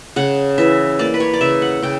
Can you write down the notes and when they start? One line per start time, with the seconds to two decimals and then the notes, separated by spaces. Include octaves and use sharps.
0.16 C#3 F#5
0.58 E3 E5
0.99 A#3 D5
1.14 B4
1.20 C#5
1.34 D5
1.41 C#3 E5
1.62 F#5
1.82 C#3 G5